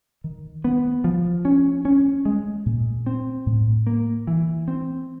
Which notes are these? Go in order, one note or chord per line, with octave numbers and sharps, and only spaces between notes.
D#3
B3
F3
C#4
C#4
G#3
A#2
C4
A2
A#3
E3
C4